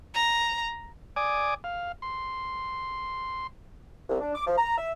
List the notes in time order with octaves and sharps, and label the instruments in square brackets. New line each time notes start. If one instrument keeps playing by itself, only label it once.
[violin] A#5
[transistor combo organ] D5 G#5 D6 D#6
F5
C6
[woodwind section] C2
D4
D6
F3
A#5
E5